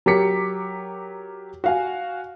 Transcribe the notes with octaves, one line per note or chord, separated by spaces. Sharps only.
F#3 G4 A#4 D6 B6 C#7
F#4 F5 G#5